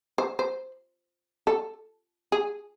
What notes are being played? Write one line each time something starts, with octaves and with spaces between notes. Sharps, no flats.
C5
C5
A4
G#4